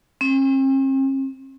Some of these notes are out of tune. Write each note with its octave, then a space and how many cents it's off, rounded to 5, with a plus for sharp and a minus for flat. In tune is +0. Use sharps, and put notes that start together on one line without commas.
C4 +45